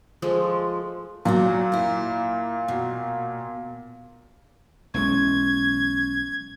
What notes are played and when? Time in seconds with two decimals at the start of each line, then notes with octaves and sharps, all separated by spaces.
0.22 F3 G#3 A3 A4
1.25 A#2 F#3 D4 F#4
1.72 A#3 E4
2.68 B2
4.94 B1 E3 G#3 C#4 G#6